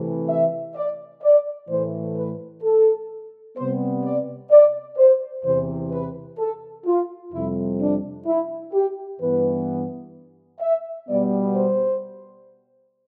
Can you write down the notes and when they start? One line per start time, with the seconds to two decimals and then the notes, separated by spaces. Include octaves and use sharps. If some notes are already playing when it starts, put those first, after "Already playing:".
Already playing: C3 E3 A3
0.28 E5
0.75 D5
1.22 D5
1.69 A2 E3 A3 C5
2.16 B4
2.63 A4
3.56 C3 G3 B3 C5
4.04 D5
4.50 D5
4.97 C5
5.44 E2 C3 E3 C5
5.91 B4
6.38 A4
6.85 F4
7.32 F2 C3 G3 E4
7.79 D4
8.26 E4
8.73 G4
9.20 G2 E3 B3 B4
10.61 E5
11.08 B2 G3 B3 D5
11.55 C5